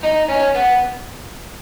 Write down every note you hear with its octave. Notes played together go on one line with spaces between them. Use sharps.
D#4
C#4
B3